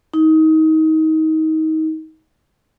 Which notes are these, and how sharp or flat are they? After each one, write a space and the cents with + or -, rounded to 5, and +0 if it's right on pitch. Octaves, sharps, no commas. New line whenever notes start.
D#4 +25